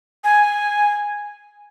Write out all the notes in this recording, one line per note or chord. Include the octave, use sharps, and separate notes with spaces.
G#5